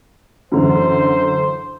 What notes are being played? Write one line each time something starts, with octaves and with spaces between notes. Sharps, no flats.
F#2 D3 E3 C5